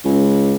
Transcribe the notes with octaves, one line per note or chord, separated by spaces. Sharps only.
C#2